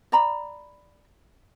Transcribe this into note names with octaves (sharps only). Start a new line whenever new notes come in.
D5 A#5 B5